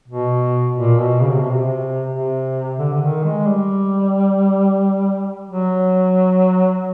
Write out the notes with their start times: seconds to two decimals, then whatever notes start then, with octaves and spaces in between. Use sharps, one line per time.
0.08 B2
0.76 A#2
0.99 B2
1.20 C#3
1.31 C3
1.41 B2
1.50 C3
2.12 C3
2.79 D3
2.93 D3
3.02 D#3
3.25 G#3
3.47 G3
5.51 F#3